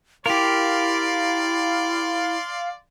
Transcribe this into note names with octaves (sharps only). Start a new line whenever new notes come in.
E4 G4 A#4 D5 F5 C6